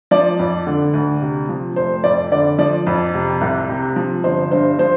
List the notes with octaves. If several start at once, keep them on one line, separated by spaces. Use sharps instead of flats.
F3 D5
F2
D3
D2
C3
F3
F1 C5
F2 D5
D3 D5
F3 D5
F2
C3
C2
C3
F3
G1 C5
G2 C5
F3 C5